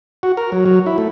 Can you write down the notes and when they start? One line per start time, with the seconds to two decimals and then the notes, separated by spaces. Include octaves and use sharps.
0.23 F#4
0.37 A#4
0.52 F#3
0.66 F#3
0.86 E4
0.98 A3